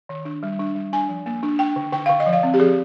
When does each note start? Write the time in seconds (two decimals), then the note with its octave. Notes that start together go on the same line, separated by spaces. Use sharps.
0.09 D#3
0.25 D4
0.43 G3
0.59 D4
0.76 G3
0.93 D4 G#5
1.09 F3
1.26 A#3
1.43 D4
1.59 D4 G5
1.76 D3
1.92 D3 G5
2.06 D3 F5
2.20 D#5
2.26 F3
2.33 F5
2.43 C4
2.54 G4
2.60 F3 G#4